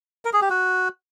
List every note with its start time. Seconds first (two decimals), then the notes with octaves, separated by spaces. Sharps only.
0.25 A#4
0.33 G#4
0.42 G4
0.50 F#4